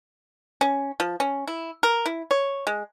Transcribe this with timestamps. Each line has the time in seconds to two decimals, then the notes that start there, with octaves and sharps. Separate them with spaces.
0.61 C#4
1.00 F3
1.20 C#4
1.48 E4
1.83 A#4
2.06 E4
2.31 C#5
2.67 G#3